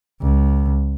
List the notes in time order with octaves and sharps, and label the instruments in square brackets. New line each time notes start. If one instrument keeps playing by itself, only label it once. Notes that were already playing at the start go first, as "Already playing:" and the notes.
[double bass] C#2